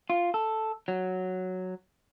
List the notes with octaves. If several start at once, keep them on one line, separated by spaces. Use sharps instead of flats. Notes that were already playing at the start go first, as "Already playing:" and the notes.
F4
A4
F#3